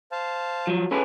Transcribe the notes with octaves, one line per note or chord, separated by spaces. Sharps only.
C5 F5 A5
F3 F#3
C#4 G#4 A4 B4